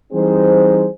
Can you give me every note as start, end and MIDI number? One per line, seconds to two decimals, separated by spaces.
0.12 0.86 52
0.12 0.86 55
0.12 0.86 60
0.12 0.86 63
0.12 0.86 68
0.12 0.86 72